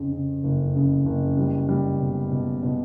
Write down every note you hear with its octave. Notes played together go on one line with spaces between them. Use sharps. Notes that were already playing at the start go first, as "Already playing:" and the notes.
Already playing: F2 C#3
C#3
F#1
C#3
F#1
G3
G3
B2
B2
B2